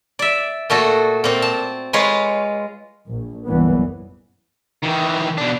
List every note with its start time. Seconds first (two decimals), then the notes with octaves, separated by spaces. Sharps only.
0.19 D5 E5
0.70 A#2 A3 F#4 A4
1.24 A#2 C4
1.42 A5
1.93 G#3 F4 B4 C#5 F5
3.08 A#1
3.47 F#1 C2 G2 E3 B3
4.83 D#3 E3
5.38 B2 D4